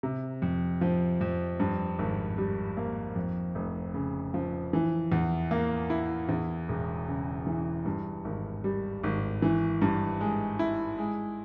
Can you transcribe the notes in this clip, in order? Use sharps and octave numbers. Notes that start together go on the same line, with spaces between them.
C3
F2
F3
F2
G2
G#1
G3
A#3
F2
F1
C#3
F3
E3
E2
A#3
E4
E2
E1
C#3
E3
G2
G#1
G3
G#1
E3
G2
G#3
E4
G#3